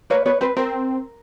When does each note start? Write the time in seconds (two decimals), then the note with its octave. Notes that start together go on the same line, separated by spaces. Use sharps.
0.10 A#3 B4 C#5
0.25 B3 B4 C#5
0.41 C4 B4
0.57 C4 A#4